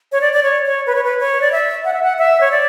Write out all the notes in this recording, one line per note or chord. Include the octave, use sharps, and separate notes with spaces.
C#5
D5
D5
C#5
C#5
B4
C#5
B4
C#5
D5
E5
F#5
E5
F#5
E5
C#5
D5